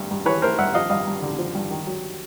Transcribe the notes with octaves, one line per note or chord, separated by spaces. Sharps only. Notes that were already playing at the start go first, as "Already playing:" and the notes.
Already playing: G2 A3
G2
E3 B4 C#5
A3 A#4 C5
G2 E5 F#5
F3 D#5 F5
G2 D#5 F5
G2
D3
F3
G2
D#3
F#3